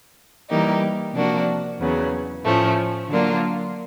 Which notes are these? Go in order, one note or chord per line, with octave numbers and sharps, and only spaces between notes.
E3 G3 A#3 D#4 G4
C3 F3 A#3 D4 F#4
E2 C#3 F#3 B3
A2 F3 A3 C#4
D3 F#3 A#3 D4 F4